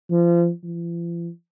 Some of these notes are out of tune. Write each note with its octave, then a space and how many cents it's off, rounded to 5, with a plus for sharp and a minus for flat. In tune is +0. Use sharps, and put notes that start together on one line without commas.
F3 -30
F3 -45